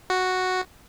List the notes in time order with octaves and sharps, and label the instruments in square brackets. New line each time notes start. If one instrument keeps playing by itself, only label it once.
[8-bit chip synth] F#4